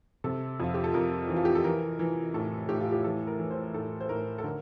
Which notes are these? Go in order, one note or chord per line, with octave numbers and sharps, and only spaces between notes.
C3 A4
F2 F4
G4
A4
F2 A#4
E3
F4
G4
A4
E3 A#4
E3
A2 A4
A2 G4
F4
G4
E3 A4
A#4
E3
C5
A2 A4
C5
A2 A#4
A4
D3 A#4